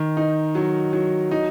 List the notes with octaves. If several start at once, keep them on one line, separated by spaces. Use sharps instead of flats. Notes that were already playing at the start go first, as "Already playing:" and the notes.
Already playing: D#3
D#4
F#3
F#3
D#4